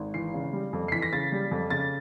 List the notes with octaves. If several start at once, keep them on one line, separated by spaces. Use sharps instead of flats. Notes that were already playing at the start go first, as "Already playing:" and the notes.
Already playing: G#1
E3 C7
C#3
G3
F2
C7
E3 B6
A#6
C#3 A6
G3
F2
C#3 A6